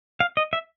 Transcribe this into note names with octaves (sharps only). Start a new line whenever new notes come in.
F5
D#5
E5